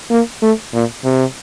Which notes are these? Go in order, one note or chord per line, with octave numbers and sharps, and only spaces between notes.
A#3
A3
A#2
C3